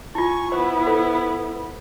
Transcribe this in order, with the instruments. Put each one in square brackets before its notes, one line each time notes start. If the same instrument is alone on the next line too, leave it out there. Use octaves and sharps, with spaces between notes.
[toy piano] E4 F4 [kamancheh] G#5 C#6
[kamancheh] B3 E4 [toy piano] C5
[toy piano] A4 C5